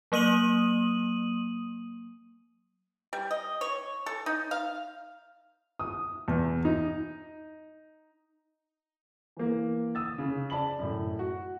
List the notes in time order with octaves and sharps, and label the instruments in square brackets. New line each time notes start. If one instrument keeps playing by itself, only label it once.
[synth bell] F#3 A#3 D#6 D#7 F#7
[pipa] G3
D#5
C#5
A4
D#4
F5
[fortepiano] D#6
E2
D#4
[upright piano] E3 A#3
D#6 E6 A6
C#3
D5 A5 B5 F#7
F#2 A2
F#4